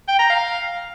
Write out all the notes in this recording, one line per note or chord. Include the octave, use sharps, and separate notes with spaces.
G5
A#5
F5